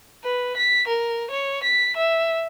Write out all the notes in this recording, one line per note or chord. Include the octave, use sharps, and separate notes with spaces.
B4
B6
A#4
C#5
B6
E5